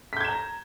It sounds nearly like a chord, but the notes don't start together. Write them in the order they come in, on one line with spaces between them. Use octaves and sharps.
B6 G6 G#6 E7 A#5